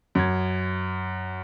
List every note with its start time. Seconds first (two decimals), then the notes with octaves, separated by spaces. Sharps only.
0.15 F#2 G#6